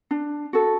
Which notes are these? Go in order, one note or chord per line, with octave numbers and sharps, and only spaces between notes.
D4
F#4 A4